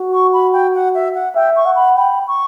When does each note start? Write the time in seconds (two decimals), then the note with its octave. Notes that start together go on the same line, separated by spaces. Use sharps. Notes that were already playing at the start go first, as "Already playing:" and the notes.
Already playing: F#4
0.13 C#6
0.33 B5
0.53 G5
0.75 F#5
0.95 E5
1.15 F#5
1.35 E5 G5
1.56 C#6
1.66 F#5
1.76 B5
1.97 G5 B5
2.28 C#6